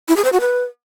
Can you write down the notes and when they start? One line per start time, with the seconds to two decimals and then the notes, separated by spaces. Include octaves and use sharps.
0.08 E4
0.16 G#4
0.24 C5
0.32 F#4
0.40 B4